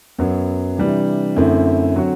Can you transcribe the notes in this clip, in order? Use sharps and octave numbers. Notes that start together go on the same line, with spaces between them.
F#2 F#3 B3
C3 E3 G3 D4
F#2 D3 A3 C4 E4
D3 F#3 C4 F#4